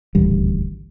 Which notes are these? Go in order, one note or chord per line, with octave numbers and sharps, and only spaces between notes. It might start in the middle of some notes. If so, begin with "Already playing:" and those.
D#1 A1 D2 G3